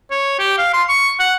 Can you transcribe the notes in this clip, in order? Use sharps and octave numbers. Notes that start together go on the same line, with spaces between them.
C#5
G4
F5
C6
C#6
F#5